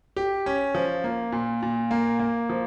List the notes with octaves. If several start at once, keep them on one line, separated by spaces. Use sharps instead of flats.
G4
C#4
F3
A#3
A#2
A#2
A#3
A#3
F3